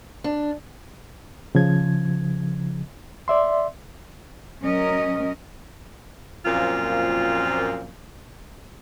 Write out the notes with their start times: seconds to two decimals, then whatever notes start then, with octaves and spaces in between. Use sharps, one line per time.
0.24 D4
1.55 C#3 F3 G#6
3.28 D5 E5 C6
4.62 F#3 C#4 A#4 D#5
6.45 F#2 A#2 F3 A#3 C4 F4